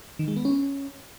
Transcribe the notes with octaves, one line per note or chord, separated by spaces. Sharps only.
D#3
G#3
B3
C#4